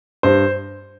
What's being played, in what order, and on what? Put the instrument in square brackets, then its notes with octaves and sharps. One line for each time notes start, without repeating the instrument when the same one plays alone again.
[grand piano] G2 C5